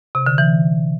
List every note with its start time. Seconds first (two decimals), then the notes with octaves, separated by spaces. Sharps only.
0.15 C3
0.26 D3
0.38 E3